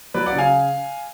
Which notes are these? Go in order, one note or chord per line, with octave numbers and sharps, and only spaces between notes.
F#3 B4 D5
D5 F#5
C#3
F5 G#5